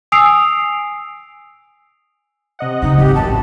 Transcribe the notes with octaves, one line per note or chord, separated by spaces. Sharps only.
G#5 D#6 E6 C7 D7 F7
C3 D#5 F#5
A#2 C#3 D#4
G#1 G4
A1 F#2 E3 A5